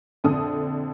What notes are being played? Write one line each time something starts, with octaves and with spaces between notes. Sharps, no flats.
A#1 F2 D3 A4 D#6